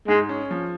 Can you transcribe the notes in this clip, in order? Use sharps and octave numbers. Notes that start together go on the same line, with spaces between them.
G#2 G#3
C#4
F3